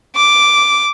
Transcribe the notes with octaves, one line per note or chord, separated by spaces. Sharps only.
D6